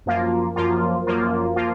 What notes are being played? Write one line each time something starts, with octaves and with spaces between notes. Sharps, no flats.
F#2 F3 A#3 F4
F#2 F3 A#3 F4
F#2 F3 A#3 F4
F3 A#3 F4